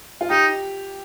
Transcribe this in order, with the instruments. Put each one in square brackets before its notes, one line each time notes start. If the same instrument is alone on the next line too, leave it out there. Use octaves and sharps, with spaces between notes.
[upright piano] F4
[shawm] D#4 [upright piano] G4